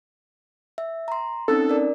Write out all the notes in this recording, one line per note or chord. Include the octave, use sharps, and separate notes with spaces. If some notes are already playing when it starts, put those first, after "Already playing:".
E5
A#5 C6
C4 C#4 D#4 A4
A#4 D5